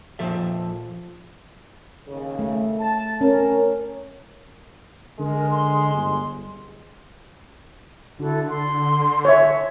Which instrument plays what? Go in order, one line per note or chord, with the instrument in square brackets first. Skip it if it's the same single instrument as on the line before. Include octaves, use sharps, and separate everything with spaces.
[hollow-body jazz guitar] A#2 F3 A4 E5
[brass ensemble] D#2 C#3
[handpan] A3
[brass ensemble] A5
[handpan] C#4 [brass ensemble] A#4
[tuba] D3 [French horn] G#3 [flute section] A#4
[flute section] C6
[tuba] G1
[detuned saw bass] D3 [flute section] E4 F#4 A4
[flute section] C6
[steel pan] C#5 E5